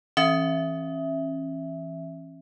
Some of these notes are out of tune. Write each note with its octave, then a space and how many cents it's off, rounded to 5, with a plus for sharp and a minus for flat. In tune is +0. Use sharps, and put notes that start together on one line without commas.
E3 +0 C#4 -40 E5 +0